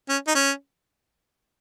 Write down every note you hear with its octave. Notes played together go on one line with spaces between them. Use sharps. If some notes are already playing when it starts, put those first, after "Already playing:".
C#4
D#4
C#4